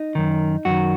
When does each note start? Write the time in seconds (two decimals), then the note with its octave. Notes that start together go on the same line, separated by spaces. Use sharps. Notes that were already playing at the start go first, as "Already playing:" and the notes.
Already playing: D#4
0.15 F#2 D#3
0.65 F#2 D#3 F#4